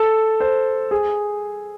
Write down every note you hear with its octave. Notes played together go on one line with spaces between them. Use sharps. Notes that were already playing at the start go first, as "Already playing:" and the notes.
Already playing: A4
C5
G#4